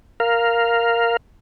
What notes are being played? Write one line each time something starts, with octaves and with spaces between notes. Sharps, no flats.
A#4 F5